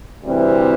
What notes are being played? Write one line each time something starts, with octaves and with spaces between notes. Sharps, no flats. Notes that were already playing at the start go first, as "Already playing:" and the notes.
D2 C3 E3 G3 C4